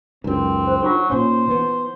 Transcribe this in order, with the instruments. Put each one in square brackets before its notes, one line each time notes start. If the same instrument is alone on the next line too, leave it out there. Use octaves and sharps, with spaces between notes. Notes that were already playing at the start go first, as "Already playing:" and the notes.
[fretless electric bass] C#2 F#2 [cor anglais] C4 [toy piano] D#4
[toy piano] C5
[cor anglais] F#3 [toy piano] D#4 F4
[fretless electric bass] A#2 C#4 [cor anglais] C5
[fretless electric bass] E3 B3